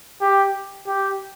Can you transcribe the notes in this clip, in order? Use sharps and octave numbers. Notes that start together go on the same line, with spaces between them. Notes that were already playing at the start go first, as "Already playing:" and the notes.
G4
G4